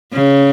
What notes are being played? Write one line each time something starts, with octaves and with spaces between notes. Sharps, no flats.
C#3